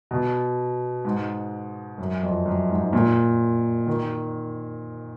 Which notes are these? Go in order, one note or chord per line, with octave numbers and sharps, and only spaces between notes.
B2
G#2
F#2
F2
F#2
G#2
A#2
D#3